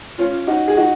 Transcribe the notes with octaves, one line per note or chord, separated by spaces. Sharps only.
C#4 F4
D#4 F#4
G#4
D#4 F#4